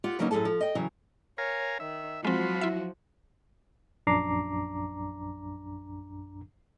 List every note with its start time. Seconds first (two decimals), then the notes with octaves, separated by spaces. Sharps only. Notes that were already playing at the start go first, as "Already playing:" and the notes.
0.04 F4 G4 F#5
0.19 C#3 F#3 A#3 B3 C#4 D#4
0.31 F#2 A2 G#4 A4 A5
0.45 F3
0.61 D#5 G5
0.75 C#3 E3 F#3
1.38 A#4 C#5 F5 G#5
1.80 D#3 E5
2.25 F3 F#3 G#3 C4 F4 F#4 B5
2.61 E4 E5
4.07 A#1 F#2 D4 A#5 D6 C7